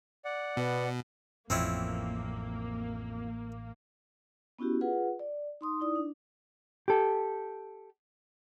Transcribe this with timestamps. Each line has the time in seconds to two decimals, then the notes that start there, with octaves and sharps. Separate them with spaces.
0.25 D5 F#5
0.57 B2 B3
1.50 A1 F2 A#3 C4 C#4 E4
4.59 B3 C#4 E4 F#4 G4
4.81 F4 G#4 B4 F#5
5.19 D5
5.61 D#4 C6 D#6
5.80 D#4 E4 D5 D#6
5.95 D4
6.88 G4 A4